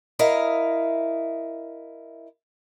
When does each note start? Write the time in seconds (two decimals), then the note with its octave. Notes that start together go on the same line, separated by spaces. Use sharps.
0.19 E4 A#4 D#5 F5